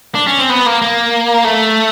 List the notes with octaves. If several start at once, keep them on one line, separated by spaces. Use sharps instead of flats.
D4
C#4
C4
B3
A#3
A#3
A3